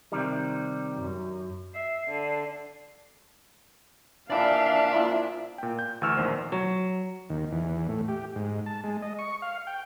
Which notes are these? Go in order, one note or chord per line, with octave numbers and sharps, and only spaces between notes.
C3 D#3 G3
F#2
E5 C7
D3
A#2 E3 D4 D5 E5 F5 A5
F3 A#3 E4
A#2 G5
G6
D2 E3 C#6 E6 F6 E7
A#1 E2 D#3 C5
F#3
D#2
E2
A2
G4
G#2
A5
G#3
D#5
C#6
F5
G5